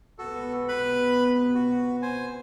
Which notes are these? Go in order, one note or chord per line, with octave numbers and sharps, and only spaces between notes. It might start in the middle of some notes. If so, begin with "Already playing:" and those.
C#2 C3 B3 F#4 A4
B4 B5
F#4
C5 G#5